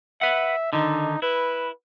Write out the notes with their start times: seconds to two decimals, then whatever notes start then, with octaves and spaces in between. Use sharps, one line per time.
0.21 B4 E5 F#5
0.73 D3 D#3 D#4
1.22 E4 B4